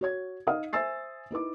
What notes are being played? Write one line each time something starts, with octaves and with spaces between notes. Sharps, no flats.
F#4 C#5 G#6
D#4 D#5 F5 D#6
C5 E5 G#5 E6 A6 C7
D#4 E4 B4 D6